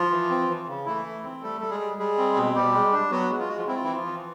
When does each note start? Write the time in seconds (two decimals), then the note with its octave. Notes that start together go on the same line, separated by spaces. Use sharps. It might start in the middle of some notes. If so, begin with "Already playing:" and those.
Already playing: F3 F4
0.11 E3
0.30 C4
0.48 E3
0.68 C#3
0.86 E3 A3 E4
1.05 A3
1.24 C4
1.42 G3 A3 A4
1.61 G3 A4
1.70 G#3 G#4
1.80 G3
1.98 G3 G#3 G#4
2.18 C4
2.36 B2
2.55 B2 G3 G4
2.74 G#3
2.93 D4
3.11 F#3 B3 F#4
3.30 G#3
3.39 F4
3.48 G#3 F#4
3.58 F3 F4
3.68 C4 E4
3.76 F4
3.84 E3 E4
3.96 F3 F4
4.05 E3